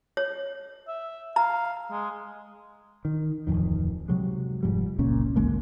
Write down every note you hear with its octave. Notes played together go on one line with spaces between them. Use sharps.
C#5
E5
F5 A#5
G#3
D#3
D1 C2 F2 D#3
C3 F#3 G#3
F1 G#2 F3 G3
F#1 C#2 A#2 C#4
G#1 D2 G#3 A#3